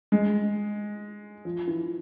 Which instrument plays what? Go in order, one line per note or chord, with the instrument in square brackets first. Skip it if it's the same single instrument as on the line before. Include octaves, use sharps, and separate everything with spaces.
[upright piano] G#3
F3
E3